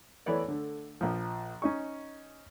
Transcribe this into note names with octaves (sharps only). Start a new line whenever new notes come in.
E3 A3 B3 C#5 D5
D3 A3
A#1 F3
C#4 D#4 C#6